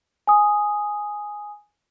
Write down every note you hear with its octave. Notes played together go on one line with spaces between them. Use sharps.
G#5 D#6